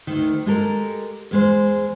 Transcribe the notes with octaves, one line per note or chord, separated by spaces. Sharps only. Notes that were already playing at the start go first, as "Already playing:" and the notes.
D2 D#3
G#3 G4 A4 A#4
E2 G#3 C5